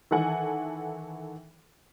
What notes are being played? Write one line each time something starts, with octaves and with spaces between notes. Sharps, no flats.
D#3 E3 A4 F#5 G#5